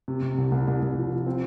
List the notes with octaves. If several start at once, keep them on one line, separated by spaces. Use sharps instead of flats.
C3
C3
C2
C2
C2
C2
F3
F3
C4